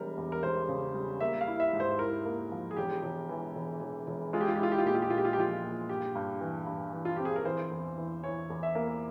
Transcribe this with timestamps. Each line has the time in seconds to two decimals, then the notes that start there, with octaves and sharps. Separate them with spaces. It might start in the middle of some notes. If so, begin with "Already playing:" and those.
Already playing: E1 G3 A#4
0.17 E2
0.32 A#4
0.43 E1 C5
0.68 C#3
0.95 G3
1.20 A#3 E5
1.41 F5
1.47 E4
1.60 E5
1.73 G#2
1.80 C5
1.99 E4 A#4
2.25 A#3
2.52 F3
2.71 G#4
2.77 E1 G4
3.03 E1
3.29 E3
3.55 E1
3.81 E1
4.07 E1
4.33 G#3 F4
4.41 G4
4.48 F4
4.55 G4
4.59 E4 F4
4.72 G4
4.78 F4
4.85 A#2 G4
4.95 F4
5.02 G4
5.10 A#2 F4
5.18 G4
5.25 F4
5.33 G4
5.37 F3 F4
5.64 A#2
5.89 G2 G4
6.15 G2
6.41 E3
6.67 G2
6.93 E3
7.05 F4
7.16 C4 G4
7.25 G#4
7.36 A#4
7.45 E3 C5
7.71 E2
7.98 E3
8.23 E3 C#5
8.50 E2
8.63 E5
8.75 A#3